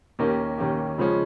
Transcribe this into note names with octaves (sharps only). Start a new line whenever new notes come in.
D#2 D#3 A#3 C#4 G4
D#2 D#3 A#3 C#4 G4
C#3 F3 G#3 C#4